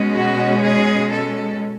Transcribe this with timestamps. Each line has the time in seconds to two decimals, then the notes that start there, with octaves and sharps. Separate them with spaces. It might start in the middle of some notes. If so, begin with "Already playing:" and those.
Already playing: B2 G#3 C#4
0.15 F#4
0.63 G#4
1.12 A4